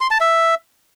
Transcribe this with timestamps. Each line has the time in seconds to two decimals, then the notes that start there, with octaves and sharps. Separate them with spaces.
0.01 C6
0.11 A5
0.21 E5